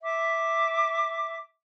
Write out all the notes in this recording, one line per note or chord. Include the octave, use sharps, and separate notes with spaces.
E5 D6